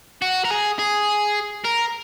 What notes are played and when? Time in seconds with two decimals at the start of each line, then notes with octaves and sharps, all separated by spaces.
0.22 F#4
0.45 A#4
0.51 G#4
0.79 G#4
1.64 A#4